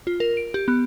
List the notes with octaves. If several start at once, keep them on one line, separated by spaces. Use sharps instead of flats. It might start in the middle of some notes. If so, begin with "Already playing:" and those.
F4
A#4
D7
G4
B3